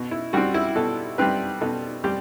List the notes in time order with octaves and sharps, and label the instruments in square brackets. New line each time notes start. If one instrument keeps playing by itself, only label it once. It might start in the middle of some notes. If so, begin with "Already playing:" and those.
Already playing: [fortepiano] B2
E4
G3 C4 F#4
E4
B2 A4
G3 C4 B4
B2 A4
G3 C4 G4